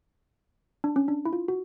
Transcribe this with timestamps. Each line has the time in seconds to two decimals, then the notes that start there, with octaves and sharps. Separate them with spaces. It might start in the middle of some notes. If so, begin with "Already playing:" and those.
0.84 D4
0.96 C#4
1.08 D4
1.25 E4
1.33 F4
1.48 F#4